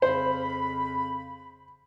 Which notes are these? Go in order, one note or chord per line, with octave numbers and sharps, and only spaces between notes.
F2 C#3 C5 B5